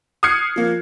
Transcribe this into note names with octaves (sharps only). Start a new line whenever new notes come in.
D#6 F6 F#6 G#6 C7 C#7
F3 A#3